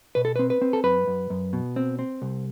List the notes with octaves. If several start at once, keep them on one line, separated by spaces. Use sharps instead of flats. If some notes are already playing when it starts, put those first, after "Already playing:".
B2 B4
A4
C4 B4
B4
C4
A4
F#2 B4
F#2
F#2
B2
C4
C4
C2